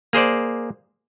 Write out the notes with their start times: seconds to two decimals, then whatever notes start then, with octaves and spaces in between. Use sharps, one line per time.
0.13 A#3 G#4 C5 D5